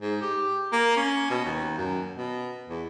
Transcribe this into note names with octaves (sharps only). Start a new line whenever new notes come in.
G#2
G4
A#3
C#4
B2
D#2
F#2
B2
E2